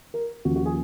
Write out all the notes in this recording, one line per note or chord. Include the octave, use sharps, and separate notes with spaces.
A#4
D#2 C#3 F3 F#4
F#4
G#4